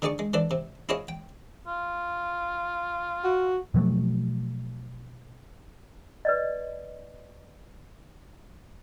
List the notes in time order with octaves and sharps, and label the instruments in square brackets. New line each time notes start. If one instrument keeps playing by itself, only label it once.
[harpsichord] D3 D#4 G#4 D5 C#6
G#3
E3 D4 A4 D5
C3
E4 F4 G#4 C#5 D#5 F5
G5
[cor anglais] F4
[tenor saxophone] F#4
[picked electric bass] B2 F3 F#3 A3
[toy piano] B4 D5 D#5